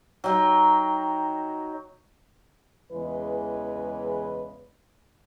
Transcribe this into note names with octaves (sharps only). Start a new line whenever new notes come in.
F#3 D#4 G5
E2 C#3 E3 G#3 B4